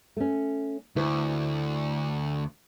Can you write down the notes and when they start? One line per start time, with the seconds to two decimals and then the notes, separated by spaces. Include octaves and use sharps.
0.17 A3 C#4
0.96 D2 E4 C5